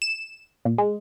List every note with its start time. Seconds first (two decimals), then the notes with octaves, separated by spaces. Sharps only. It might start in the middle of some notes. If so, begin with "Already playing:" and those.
0.02 E7
0.65 A#2
0.78 G#3